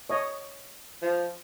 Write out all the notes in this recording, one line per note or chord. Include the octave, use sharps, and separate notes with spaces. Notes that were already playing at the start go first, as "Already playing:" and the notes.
C#5 D#5
F3